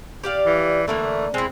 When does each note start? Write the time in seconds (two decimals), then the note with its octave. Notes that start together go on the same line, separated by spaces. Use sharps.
0.24 G4 D5 F5
0.46 E3
0.88 D3 E3 A3 A#3
1.34 G#3 C4 E4